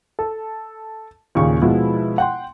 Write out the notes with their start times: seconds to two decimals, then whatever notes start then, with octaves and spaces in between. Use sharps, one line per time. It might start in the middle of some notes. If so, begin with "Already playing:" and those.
0.19 A4
1.35 D#2 A#2 C#3 C#6
1.62 B2 F3 G#3 B3 E4
2.18 F#5 G5 C6